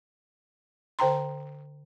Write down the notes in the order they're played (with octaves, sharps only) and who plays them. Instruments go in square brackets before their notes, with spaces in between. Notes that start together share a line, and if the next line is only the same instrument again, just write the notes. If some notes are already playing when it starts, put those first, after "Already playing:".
[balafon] D3 C5 G5 A#5 C6